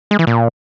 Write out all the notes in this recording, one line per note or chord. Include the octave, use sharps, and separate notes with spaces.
G#3
E3
A#2